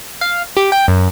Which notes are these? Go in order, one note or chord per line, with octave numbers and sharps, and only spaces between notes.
F5
G4
G5
F#2